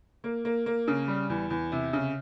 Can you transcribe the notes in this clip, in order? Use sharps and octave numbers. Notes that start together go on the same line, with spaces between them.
A#3
A#3
A#3
C#3
G3
E2
E2
C3
C#3